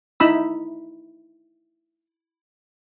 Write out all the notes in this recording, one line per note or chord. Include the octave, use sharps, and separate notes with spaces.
D#4 E4 B5 E6